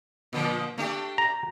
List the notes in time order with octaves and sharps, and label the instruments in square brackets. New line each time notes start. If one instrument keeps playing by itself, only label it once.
[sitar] A#2 D3 F3
A3 D4 G4
[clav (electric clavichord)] A#5